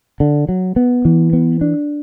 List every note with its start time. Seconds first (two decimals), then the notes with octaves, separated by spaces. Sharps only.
0.20 D3
0.49 F#3
0.76 B3
1.05 E3
1.33 B3
1.61 D4